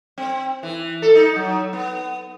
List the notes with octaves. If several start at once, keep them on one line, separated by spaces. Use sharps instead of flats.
C4
E3
A4
D#4
F#3
B3